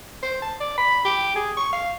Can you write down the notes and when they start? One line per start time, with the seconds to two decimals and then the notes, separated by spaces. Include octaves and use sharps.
0.23 C5
0.42 A5
0.60 D5
0.78 B5
1.05 G4
1.35 G#4
1.57 C#6
1.72 F5